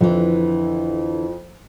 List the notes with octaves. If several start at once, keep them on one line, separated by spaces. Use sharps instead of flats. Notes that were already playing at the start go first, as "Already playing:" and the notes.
F2 D3 E3